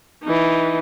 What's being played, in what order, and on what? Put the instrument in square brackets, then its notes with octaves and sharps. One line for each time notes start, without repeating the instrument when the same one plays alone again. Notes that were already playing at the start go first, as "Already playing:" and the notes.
[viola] E3 D#4